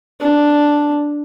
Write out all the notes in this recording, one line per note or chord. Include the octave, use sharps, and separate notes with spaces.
D4